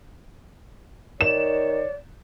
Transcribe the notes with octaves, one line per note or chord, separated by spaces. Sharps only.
D#3 C#5 D5 E7